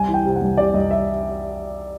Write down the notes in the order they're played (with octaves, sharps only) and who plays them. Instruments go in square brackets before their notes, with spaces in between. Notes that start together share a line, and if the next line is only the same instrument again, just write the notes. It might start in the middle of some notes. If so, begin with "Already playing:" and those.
Already playing: [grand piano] C2 G#5
E3
G5
C3
F#5
C2
C3 D5
C2 D#5
E5